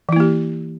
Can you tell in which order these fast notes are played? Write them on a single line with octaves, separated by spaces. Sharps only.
E3 E4 A#3 G4